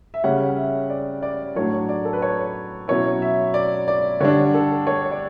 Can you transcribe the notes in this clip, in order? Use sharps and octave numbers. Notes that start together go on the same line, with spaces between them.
E5
C#3 G3 C#4 F#5
E5
D5
D5
A2 F#3 A3 D4 C#5
D5
A4
B4
C#5
B2 F#3 C#4 E4 C#5
E5
D5
D5
D3 G3 D4 C#5
A4
C#5
D5